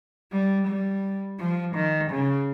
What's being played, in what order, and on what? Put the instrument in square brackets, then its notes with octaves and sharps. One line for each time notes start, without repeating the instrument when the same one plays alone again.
[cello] G3
G3
F3
D#3
C#3